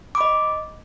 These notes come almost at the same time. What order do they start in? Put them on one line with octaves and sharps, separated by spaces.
D6 B5 D#5